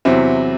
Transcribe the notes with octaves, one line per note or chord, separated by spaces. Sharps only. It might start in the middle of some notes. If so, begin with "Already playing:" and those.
E2 C3 F#3 C4 E4